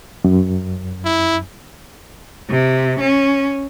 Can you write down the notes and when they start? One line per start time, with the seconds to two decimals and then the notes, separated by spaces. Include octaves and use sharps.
0.24 F#2
1.05 E4
2.50 C3
3.00 C#4